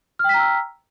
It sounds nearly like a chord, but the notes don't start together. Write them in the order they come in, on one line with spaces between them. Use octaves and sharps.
F6 G5 B6 A#5 E6